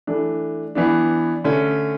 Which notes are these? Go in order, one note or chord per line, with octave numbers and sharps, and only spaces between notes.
E3 A3 D4
E3 B3 D4
D3 A3 C#4